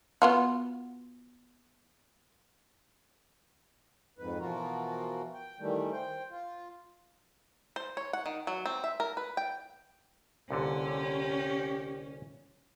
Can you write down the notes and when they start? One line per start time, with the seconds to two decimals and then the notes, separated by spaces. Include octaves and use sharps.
0.22 B3 F4 F#4
4.19 F2 G#2 B4
4.39 B2 E3 F3 F4 F#4 A#4
5.34 G5
5.60 D#3 E3 G3 A3
5.92 C5 G5
6.30 F4
7.76 C5
7.97 C#5
8.13 F#5
8.26 D#3
8.47 F#3
8.66 C4
8.84 E5
9.00 A#4
9.17 B4
9.37 G5
10.50 C2 A#2 D3 C#4 G4